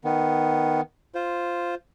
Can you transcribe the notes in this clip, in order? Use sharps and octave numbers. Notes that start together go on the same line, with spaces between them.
D#3 B3
F4 C5